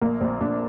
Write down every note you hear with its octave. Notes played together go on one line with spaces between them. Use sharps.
A#1 A#3
A#1 C4
A#1 D4